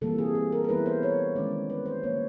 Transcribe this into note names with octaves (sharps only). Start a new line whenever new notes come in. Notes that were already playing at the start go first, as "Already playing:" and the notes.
C3 E3 G3 A#3 A4
G#4
A4
A#4
A#4
E3 G3 B3 E4 B4
C5
C#5
C3 D#3 G#3 C#4 D5
B4
C5
D3 F3 A#3 C#5